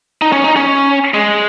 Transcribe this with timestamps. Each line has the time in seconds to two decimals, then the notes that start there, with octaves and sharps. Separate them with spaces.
0.22 D#4
0.32 C#4
0.44 D#4
0.57 C#4
1.14 G#3